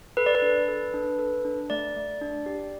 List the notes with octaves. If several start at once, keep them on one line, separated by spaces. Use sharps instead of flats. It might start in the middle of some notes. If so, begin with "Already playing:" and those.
A4 B4
D5
B4
D4
A4
D4
A4
D4
A3 D5
A3
D4
G4